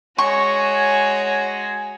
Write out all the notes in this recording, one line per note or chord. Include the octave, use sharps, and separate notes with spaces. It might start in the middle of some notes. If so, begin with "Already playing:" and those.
G#3 F#4 C#5 G#5 C#6